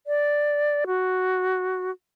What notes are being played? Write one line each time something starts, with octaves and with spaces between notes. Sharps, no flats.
D5
F#4